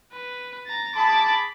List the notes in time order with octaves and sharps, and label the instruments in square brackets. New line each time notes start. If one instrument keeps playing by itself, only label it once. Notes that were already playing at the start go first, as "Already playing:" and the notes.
[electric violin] B4
A#5 A6
[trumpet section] G#4 B5 [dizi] A5 [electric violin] D6 A6